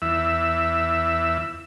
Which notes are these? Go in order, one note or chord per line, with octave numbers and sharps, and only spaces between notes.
E2 E5